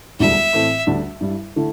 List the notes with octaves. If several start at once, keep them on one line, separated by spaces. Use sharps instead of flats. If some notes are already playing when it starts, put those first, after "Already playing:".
E1 D2 D3 G3 E5
A2 E3 A3 C4
D2 D3 G3 D4
G2 G3 E4
D3 A3 E4